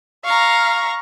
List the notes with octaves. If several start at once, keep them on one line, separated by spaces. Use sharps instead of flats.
F5 A#5 C#6